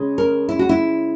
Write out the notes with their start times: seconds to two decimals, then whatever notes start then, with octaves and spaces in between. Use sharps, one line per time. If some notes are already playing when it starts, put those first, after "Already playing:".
Already playing: C#3 G#3
0.18 A#4
0.49 E4
0.59 F#4
0.69 E4